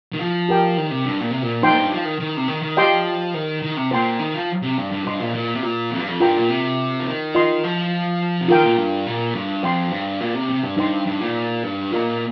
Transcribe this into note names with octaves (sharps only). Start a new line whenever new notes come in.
D#3
F3
G4 A#4 G5
D#3
C3
G2
A#2
C3
A#2
F2 D#4 C5 G5 C6
A#2
G2
F3
D#3
D#3
C3
D#3
D#3
F3 G4 D#5 G5 C6
D#3
D#3
C3
A#2 C5 G5 C6
D#3
F3
C3
G2
G2
G2 C5 D#5 C6
A#2
A#2
C3
A#2
F2
G2
F2
G2 F4 A#4 G5 A#5
A#2
C3
F3
D#3
F4 D#5 C6
F3
C3
D#3 F4 A#4 G5
A#2
G2
A#2
G2
F2 C5 G5 C6
G2
A#2
C3
C3
G2
G2 D#4 C5 G5 C6
G2
A#2
G2
A#2 F4 A#4 D#5 A#5